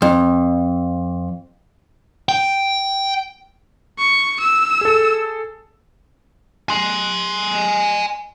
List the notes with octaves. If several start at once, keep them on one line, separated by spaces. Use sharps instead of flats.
F2
G5
C#6
E6
G#4 A4
G#5 C6